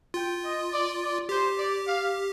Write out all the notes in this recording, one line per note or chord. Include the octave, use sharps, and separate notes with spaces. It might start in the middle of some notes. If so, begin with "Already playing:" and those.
F4 G5
D#5
D5
D5
G4 C5
D5
F5